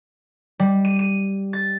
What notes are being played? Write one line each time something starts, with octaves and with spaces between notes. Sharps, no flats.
G3
D#7
D#7
A6